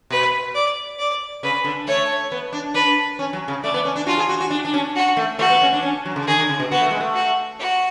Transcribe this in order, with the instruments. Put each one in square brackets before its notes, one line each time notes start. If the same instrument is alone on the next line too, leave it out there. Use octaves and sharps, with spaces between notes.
[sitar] B2 [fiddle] B4
[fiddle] D5
D5
[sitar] C#3 [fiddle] B4
[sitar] D3
[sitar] A3 [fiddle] C#5
[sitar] B3
D4
[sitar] D4 [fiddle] B4
[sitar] C#4
F#3
C#3
[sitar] A3 [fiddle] D5
[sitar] B3
C#4
D4
[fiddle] F4 [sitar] F#4
[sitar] G#4
F#4
F#4
D4
D4
C#4
[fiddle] F#4
[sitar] A3
[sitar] A3 [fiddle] F#4
[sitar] B3
C#4
D4
C#4
F#3
C#3
[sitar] D3 [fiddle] G#4
[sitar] D3
C#3
B2
[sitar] B3 [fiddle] F#4
[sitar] A3
G#3
A3
[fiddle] F#4
F#4